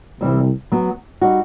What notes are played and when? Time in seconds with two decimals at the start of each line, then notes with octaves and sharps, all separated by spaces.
0.20 C2 C3 E3 G3 C4
0.72 F#3 B3 F#4
1.21 G3 D#4 F#4